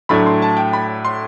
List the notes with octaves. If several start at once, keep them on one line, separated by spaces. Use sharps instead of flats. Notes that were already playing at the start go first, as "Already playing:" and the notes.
A2 F#3 A3 D4 B5
C6
A5
G5
B5
C6